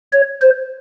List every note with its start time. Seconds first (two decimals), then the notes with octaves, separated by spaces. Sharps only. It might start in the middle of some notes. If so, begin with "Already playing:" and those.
0.13 C#5
0.41 C5